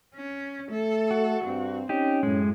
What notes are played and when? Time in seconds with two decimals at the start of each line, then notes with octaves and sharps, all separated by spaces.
0.14 C#4
0.71 A3 A4
1.11 F#4
1.44 G2 C4
1.89 C#4 D#4 G4
2.23 F#2 A2 G#3